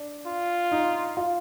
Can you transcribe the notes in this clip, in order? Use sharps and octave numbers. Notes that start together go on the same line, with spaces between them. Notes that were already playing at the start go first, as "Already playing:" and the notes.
Already playing: D4
F4
D#4
F4